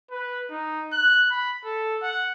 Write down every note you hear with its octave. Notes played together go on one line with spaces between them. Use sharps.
B4
D#4
F#6
B5
A4
F#5